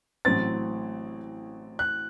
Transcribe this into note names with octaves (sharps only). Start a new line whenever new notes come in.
A1 A2 F#3 C4 A6
F#6